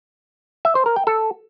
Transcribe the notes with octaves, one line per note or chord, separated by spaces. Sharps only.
E5
C5
A#4
G5
A4